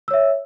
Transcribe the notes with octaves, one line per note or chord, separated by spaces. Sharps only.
C#5 E5 E6